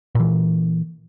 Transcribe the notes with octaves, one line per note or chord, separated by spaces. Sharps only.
A#2 E3